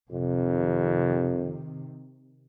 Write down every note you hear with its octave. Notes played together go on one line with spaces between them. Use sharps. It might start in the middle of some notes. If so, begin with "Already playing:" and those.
F2 C3 D#3